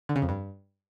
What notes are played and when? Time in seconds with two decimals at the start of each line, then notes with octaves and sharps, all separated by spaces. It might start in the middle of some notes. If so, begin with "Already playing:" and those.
0.09 D3
0.16 C#3
0.22 F2
0.29 G2